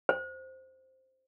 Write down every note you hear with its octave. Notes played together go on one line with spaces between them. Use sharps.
C5